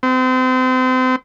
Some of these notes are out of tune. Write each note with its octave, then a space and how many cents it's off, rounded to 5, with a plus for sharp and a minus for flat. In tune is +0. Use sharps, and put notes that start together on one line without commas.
C4 -35